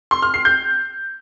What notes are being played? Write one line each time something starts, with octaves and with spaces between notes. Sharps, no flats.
C6
F6
C7
G6